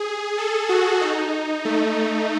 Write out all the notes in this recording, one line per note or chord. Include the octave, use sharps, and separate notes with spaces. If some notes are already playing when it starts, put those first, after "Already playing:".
Already playing: G#4
A4
F#4
D#4
A3